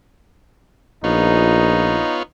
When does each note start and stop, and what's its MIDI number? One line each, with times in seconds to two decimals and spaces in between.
1.04 2.02 34
1.04 2.23 59
1.04 2.21 63
1.04 2.23 65
1.04 2.23 73